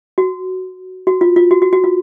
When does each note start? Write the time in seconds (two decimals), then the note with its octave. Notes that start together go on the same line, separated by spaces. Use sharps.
0.18 F#4
1.07 F#4
1.21 F4
1.36 F4
1.51 F#4
1.62 F#4
1.73 F#4
1.84 F4